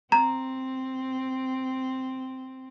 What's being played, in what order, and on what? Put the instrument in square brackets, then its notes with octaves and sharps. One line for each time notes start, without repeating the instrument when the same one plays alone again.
[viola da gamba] C4 [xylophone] A#5